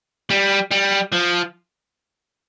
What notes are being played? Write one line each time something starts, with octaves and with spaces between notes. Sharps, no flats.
G3
G3
F3